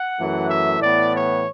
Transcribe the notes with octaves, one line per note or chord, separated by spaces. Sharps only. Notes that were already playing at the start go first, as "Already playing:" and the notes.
Already playing: F#5
F#2 E3 A3
E5
A2 E3 B3 D5
C#5